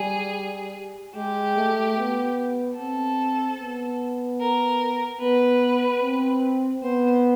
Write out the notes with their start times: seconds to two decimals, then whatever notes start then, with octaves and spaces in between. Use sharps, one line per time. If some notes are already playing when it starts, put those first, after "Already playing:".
Already playing: G3 G#4
1.16 G#3 G4
1.57 A3
1.98 B3
2.78 C4 A4
3.59 B3
4.40 A#4
5.21 B3 B4
6.02 C4
6.82 B3 C5